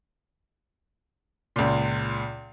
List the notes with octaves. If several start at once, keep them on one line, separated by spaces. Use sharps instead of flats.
C#2 A#2